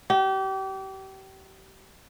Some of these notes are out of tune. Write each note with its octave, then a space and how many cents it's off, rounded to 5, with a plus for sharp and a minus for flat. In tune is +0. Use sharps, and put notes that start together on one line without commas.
G4 -30